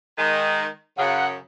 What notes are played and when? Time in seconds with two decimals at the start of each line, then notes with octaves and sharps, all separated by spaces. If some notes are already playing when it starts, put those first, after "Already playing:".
0.18 D#3 G#3
0.98 F#2 C#3 F#5